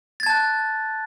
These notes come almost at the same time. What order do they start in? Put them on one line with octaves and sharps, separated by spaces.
A6 G#6 A5 F#6